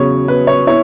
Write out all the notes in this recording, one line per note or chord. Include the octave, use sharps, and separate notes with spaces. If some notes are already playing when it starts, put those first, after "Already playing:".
Already playing: E2 C#3 F#3 C#5
B4
C#5
E4 C#5